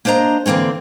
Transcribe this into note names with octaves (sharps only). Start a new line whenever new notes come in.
A#3 D4 C5 D#5 A#5
D3 E3 A#3 C4 C#4